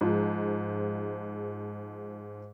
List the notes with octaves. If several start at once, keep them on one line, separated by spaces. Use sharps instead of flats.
G#2 F3 G#3